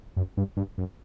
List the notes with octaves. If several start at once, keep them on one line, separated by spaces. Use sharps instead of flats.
F#2
G2
G2
F#2